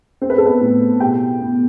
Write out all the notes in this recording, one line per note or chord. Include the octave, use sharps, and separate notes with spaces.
C4 C5
B4
A4
B3 B4
A2
B2 G4 G5
B3